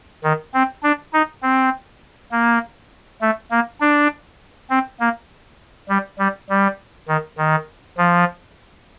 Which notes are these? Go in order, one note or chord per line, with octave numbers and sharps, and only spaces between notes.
D#3
C4
D4
D#4
C4
A#3
A3
A#3
D4
C4
A#3
G3
G3
G3
D#3
D#3
F3